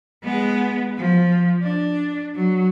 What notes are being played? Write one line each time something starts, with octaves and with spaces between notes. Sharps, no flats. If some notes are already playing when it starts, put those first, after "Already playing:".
G#3 B3
F3
D4
F#3